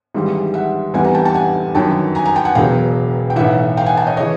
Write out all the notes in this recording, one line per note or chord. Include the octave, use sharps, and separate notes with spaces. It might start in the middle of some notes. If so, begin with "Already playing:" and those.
G#1 G#2 E3 G3
E5 F#5
F1 E2 C3 E3 G3 F#5 G#5
G#5 A#5
G5 A5
G5 A5
F#5 G#5
G1 F#2 D#3 F#3 G5 A5
G#5 A#5
G#5 A#5
G5 A5
F#5 G#5
E1 E2 C#3 F#3 F5 G5
G5
B1 A2 E3 E5 F#5
F5 G5
F#5 G#5
G5 A5
C#5 D#5
C#3 E3 C#5 D#5